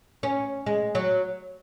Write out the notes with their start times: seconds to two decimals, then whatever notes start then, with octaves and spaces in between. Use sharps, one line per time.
0.23 C#4
0.66 G#3
0.95 F#3